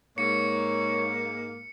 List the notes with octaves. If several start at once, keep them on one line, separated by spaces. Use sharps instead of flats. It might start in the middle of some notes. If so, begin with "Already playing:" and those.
G#2 A#3 C#5 C#7